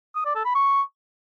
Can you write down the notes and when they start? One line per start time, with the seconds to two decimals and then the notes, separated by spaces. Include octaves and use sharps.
0.16 D#6
0.25 D5
0.35 A4
0.45 B5
0.55 C#6